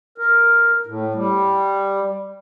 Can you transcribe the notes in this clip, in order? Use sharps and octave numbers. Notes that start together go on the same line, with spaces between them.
A#4
A2
G3